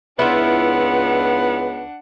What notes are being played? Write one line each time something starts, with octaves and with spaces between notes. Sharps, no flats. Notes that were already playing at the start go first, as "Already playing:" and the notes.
C#2 B3 D4 E4 F4 F#5